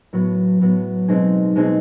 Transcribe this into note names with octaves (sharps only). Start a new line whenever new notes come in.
A2 F#3 B3
A2 F#3 B3
B2 G#3 C4 D#4 G#4
B2 G#3 C4 D#4 G#4